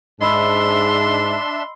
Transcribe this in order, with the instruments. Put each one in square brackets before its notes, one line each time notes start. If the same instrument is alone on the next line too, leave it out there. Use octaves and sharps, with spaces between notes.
[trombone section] G#2 [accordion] D4 E5 [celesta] D#5 B5 E6 [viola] C6